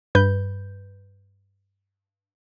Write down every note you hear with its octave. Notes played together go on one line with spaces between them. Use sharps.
G2 B4 G6